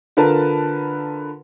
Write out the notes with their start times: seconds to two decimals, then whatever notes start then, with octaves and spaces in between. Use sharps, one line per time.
0.17 D3 F4 A#4 B4 A5